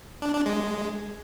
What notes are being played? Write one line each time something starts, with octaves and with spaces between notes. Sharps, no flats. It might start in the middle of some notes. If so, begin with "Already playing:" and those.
D4
D4
G#3